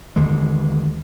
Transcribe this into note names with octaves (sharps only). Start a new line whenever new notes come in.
D#2 D3 E3 G#3